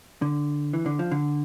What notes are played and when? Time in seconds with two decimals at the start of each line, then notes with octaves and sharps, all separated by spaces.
0.22 D3
0.73 E3
0.86 D3
0.99 F3
1.11 D3